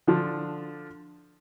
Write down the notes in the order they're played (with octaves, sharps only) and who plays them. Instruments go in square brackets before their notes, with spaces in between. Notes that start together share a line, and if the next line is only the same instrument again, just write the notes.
[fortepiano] D3 F3 D4